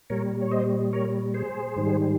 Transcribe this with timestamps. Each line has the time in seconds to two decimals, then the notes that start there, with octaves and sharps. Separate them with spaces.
0.10 A#2 G3 A#4 C#5
0.41 C#5
0.51 C5 D#5
0.93 A#4 C#5
1.34 G#4 C5
1.76 G#2 D#3 G3